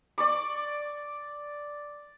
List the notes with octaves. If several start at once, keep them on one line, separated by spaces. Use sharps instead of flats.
D5 C#6 D6